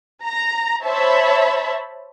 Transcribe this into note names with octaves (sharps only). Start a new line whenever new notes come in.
A#5
C5 C#5 E5 A5 B5